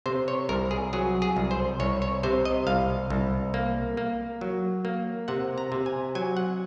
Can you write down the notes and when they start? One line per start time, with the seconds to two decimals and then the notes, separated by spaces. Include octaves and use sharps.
0.06 C3 C5
0.28 C#5
0.49 C2 A#4
0.71 G#4
0.93 F#3 G#4
1.22 G#4
1.37 C2
1.51 C5
1.80 C2 C#5
2.02 C#5
2.23 C3 C5
2.45 D#5
2.67 C2 F5
3.10 C2
3.54 A#3
3.97 A#3
4.41 F#3
4.85 A#3
5.28 C3 F#5
5.58 A#5
5.72 C3
5.86 G#5
6.15 F#3 G#5
6.37 F#5